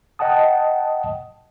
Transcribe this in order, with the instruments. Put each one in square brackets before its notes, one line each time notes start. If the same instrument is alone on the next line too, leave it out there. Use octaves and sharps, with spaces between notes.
[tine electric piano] D#5 F#5 G5 A5 D#6